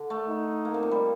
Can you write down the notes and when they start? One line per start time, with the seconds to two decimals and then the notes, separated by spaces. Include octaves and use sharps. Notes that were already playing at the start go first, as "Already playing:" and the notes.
Already playing: D3
0.10 A3
0.29 D#4
0.65 A#3
0.74 C3
0.83 A#2
0.91 G3